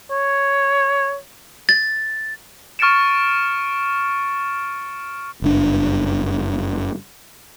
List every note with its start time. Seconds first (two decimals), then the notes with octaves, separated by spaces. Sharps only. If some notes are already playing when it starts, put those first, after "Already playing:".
0.11 C#5
1.69 A6
2.79 C#6 F6 A6 C#7 D7 E7
5.42 F#1 G2 D4